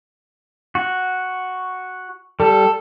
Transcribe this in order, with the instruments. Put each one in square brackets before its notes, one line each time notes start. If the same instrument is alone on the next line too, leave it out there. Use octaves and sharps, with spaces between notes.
[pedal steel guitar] F#4
[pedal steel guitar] G3 [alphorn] A4